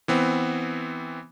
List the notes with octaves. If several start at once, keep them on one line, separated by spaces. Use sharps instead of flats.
E3 B3 C4